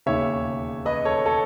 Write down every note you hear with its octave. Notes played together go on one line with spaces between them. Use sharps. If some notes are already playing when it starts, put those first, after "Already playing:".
E1 D#2 C#3 C#5 E5
B4 D#5
A4 C#5
A4 C#5